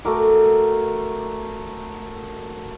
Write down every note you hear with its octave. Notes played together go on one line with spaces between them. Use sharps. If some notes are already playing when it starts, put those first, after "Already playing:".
A3 F#4 A#4 D6